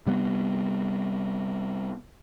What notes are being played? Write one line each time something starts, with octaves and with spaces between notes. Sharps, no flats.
C3 G3 B3